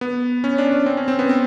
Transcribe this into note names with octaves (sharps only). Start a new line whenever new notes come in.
B3
C#4
D4
C#4
C4
C#4
C4
B3
C4